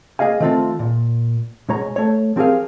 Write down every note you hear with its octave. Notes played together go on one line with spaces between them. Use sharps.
A#3 G#4 D#5 F5 G#5
D#3 F3 A3 C4 F4 A4
A#2
B2 G#3 C#5 A#5
A3 C#5
F3 C4 G4 G#4 A#4 F5